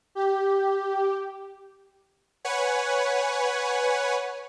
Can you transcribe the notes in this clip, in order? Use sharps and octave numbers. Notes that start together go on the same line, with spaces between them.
G4
B4 C#5 F#5 G#5